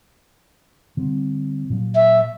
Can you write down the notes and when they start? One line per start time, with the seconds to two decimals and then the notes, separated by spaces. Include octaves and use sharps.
0.97 D3 G3 C4
1.70 A#2 F#3
1.95 E5